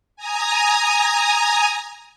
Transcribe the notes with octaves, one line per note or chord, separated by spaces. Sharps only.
G#5 A#5 D#6